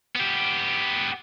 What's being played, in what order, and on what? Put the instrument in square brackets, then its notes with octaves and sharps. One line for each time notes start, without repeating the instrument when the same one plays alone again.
[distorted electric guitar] B3 G4